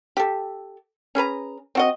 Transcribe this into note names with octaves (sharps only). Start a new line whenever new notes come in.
G4 A4
C#4 G#4 B4 A#5
C4 F#4 D#5